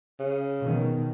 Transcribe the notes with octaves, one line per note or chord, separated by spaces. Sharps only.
C#3
B2 D#3